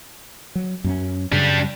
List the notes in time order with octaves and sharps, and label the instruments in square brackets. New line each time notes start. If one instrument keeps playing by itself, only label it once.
[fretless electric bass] F#3
F#2 C4 C#4
[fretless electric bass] F#2 C#3 [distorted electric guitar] G3 D4